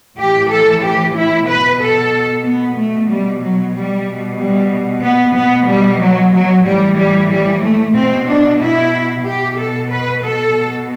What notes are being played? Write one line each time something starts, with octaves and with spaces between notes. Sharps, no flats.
A2 E3 G4
A4
G4
E4
B2 B4
A4
B3
B2 A3
G3
F#3
G3
B2
G3
B3
B2 B3
G3
F#3
F#3
A2 E3 G3
G3
G3
A3
B2 C4
D4
E4
B2 G4
A4
B4
A4
B2